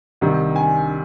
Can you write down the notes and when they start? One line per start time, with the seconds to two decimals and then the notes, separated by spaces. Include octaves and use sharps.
0.21 C2 C3 D#3
0.56 G#5